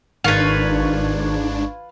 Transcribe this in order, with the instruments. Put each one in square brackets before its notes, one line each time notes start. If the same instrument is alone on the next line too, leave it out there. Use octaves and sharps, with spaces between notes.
[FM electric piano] G#1 C#6 G#6 [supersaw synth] G#2 D4 [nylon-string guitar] D#3 [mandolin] F4 B4